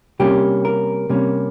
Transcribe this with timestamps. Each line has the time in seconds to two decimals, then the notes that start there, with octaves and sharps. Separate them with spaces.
0.20 C3 G3 A#3 C#4 G4
0.65 A#4
1.10 C3 G3 A#3 C#4